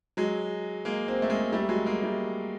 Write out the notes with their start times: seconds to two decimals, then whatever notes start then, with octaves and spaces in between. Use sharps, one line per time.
0.17 F#3 G#3
0.85 G#3 A#3
1.08 A#3 C4
1.22 A3
1.30 G#3 A#3
1.52 G3 A3
1.69 F#3 G#3
1.86 G#3 A#3
2.03 G3 A3